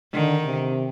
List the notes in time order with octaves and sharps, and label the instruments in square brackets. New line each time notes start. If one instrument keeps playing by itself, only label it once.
[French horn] D3 [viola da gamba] D#3
[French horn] C3